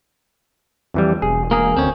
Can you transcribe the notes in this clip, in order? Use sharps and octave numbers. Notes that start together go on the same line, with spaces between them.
F2 E3 G3
E1 G#4
A#3 G#4 A#4
D2 C4 C#4